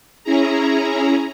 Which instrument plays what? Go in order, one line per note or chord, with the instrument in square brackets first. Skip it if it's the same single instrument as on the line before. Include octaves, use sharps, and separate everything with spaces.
[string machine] C#4 E4 G#4 A#5